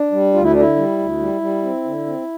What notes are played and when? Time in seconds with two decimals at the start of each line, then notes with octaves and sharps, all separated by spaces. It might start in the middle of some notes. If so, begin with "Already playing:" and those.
Already playing: D4
0.12 G3
0.34 D2 F4
0.43 E4
0.52 D3 D4
0.60 E4
0.76 G3
0.98 D2
1.19 G3
1.41 G3
1.62 C4
1.84 D3
2.06 C4